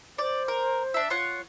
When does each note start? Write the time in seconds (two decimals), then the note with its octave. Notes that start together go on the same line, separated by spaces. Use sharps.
0.18 C5 D5
0.48 A#4
0.94 D4 E5
1.10 F4 C#5 F#5